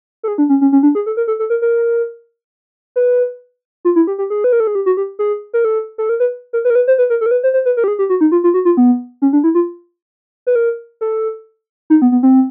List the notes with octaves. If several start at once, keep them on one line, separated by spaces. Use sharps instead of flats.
A4
G#4
D4
C#4
C#4
C#4
D4
G#4
A4
A#4
A4
A4
A#4
A#4
B4
F4
E4
G4
G4
G#4
B4
A#4
A4
G#4
G4
F#4
G4
G#4
A#4
A4
A4
A#4
B4
A#4
B4
A#4
B4
C5
B4
A#4
A4
A#4
B4
C5
C5
B4
A#4
G4
G#4
G4
F#4
D#4
F4
F4
F#4
F4
B3
C#4
D4
E4
F4
B4
A#4
A4
D#4
B3
B3
C4